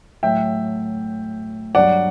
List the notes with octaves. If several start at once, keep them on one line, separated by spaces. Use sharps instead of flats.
A2 F#3 E5 G5
G2 F#3 D5 F#5